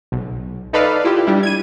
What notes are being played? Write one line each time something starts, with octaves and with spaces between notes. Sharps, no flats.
B1
D#4 A4 B4 D5 F5
E4 F4 G4
G3 D4 E4
G#6 D#7